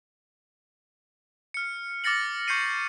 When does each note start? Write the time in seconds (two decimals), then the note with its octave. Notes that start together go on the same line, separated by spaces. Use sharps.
1.54 F6 C#7
2.04 D6 F6 A6 A#6 C#7 F#7
2.48 C#6 G6 C7 C#7 D#7